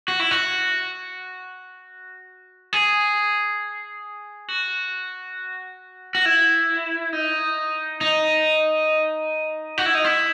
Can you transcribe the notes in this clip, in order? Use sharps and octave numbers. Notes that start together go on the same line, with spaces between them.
F#4
E4
F#4
G#4
F#4
F#4
E4
D#4
D#4
F#4
E4
D#4
E4